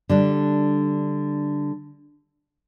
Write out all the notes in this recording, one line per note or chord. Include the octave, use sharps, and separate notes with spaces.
D3 G3 D4